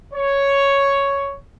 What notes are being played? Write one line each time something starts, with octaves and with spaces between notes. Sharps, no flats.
C#5